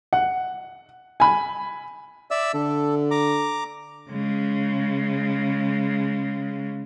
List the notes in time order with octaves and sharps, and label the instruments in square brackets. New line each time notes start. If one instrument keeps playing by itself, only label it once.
[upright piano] F#5
G#5 B5
[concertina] D5 E5 E6
[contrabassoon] D3 [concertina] A4
[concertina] A#5 D6
[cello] C#3 G#3